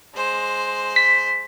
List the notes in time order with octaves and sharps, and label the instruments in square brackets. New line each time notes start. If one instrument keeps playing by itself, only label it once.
[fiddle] G#3 C5
[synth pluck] B6